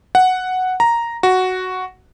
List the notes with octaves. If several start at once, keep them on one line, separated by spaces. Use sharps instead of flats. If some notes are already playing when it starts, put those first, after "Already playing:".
F#5
A#5
F#4